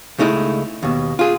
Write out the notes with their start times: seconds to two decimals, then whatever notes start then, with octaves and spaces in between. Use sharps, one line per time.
0.18 C#2 A3 D#4 E4 G#4
0.83 D#2 B2
1.19 F4 G#4